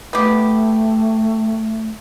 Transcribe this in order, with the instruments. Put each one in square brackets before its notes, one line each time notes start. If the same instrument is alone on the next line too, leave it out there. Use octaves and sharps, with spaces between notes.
[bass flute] A3 [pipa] B3 G4